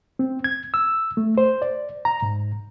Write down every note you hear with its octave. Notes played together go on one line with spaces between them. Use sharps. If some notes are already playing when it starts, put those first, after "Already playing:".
C4
G#6
E6
A3
C5
D5
A#5
G#2